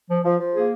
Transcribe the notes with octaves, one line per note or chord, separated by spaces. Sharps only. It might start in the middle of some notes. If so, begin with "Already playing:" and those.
F3
F3
F3
A#3 G#4